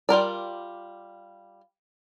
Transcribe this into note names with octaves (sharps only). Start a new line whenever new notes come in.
G3 F4 A#4 D5